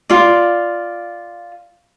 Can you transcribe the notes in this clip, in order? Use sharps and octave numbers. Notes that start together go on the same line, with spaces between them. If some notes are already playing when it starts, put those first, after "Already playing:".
F4 D5